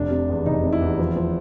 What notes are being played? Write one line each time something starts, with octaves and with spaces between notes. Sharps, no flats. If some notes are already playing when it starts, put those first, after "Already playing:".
Already playing: F1 D4
C3
E2
F1 D#4
C3
E4
E2
F3
F3